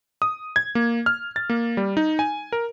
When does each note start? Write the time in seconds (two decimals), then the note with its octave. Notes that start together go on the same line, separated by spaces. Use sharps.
0.22 D#6
0.56 G#6
0.75 A#3
1.06 F6
1.36 A6
1.50 A#3
1.77 G3
1.97 D#4
2.19 G#5
2.52 A#4